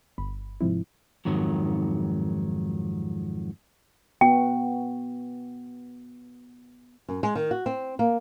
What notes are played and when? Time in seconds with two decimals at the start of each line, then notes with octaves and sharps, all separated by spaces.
0.18 G1 B5
0.61 G#2 C3 F3 C4 E4
1.25 F2 G#2 D#3 F#3
4.21 B3 F#4 G5
7.09 F#2
7.23 G#3
7.35 D#3
7.51 F#4
7.66 C4
7.99 A#3